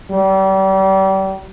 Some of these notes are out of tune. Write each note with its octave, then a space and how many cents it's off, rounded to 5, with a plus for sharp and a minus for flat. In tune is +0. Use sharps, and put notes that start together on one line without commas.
G3 -35